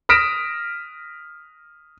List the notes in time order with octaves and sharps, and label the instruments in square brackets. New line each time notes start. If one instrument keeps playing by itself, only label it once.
[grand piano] D#6 F6 A#6 B6 D7 E7